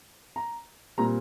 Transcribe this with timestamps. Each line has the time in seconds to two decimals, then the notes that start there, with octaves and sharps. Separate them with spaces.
0.36 A#5
0.98 A#2 G3 C4 A#5